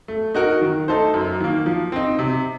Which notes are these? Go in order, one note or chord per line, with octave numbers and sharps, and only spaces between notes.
A3
D#4 F#4 A#4
D#3
A3 D#4 A4 C5
F#2
D#3 A#3
F3
C4 D#4
C3